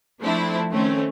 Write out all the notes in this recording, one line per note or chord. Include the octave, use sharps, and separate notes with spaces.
F3 A3 C4 D4 E4
D#3 A3 C4 C#4